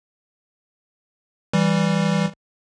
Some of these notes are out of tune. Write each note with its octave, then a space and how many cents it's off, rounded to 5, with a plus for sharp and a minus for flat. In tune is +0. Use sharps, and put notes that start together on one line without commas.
E3 -5 G3 +0